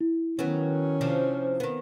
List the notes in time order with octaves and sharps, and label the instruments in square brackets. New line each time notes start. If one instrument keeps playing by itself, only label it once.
[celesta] E4
[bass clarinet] D#3 [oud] F#3 B3 [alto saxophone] C#4
[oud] C3 F3 D4
D#3 B3